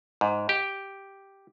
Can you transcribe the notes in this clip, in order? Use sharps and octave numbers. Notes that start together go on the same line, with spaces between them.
G#2
G4